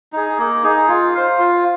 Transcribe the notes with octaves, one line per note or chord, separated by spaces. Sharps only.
D#4 G#4
A#3
D#4 G#4
F4
C5 F5
F4